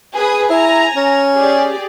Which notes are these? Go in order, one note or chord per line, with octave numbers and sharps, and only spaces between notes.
G#4 B4 D#6
E4 G#5 A#5
C#4
G4 G#4 D5